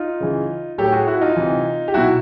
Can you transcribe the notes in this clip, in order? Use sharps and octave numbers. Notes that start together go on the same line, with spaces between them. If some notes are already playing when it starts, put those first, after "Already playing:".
Already playing: D#4 F4
C#3 E3
A2 F#3 G4 A4
F#4 G#4
E4 F#4
D#4 F4
C3 E3
G4
B2 F#3 E4 F#4